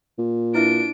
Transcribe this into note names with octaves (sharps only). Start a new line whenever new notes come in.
A#2
D4 E4 B4 E5 D7